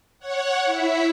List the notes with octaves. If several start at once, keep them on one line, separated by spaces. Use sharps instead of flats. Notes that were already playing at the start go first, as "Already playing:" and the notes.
C#5 F#5
E4 E5